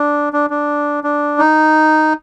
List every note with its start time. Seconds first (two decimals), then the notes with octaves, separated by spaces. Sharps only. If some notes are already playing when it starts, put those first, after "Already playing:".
Already playing: D4
0.33 D4
0.50 D4
1.04 D4
1.39 D#4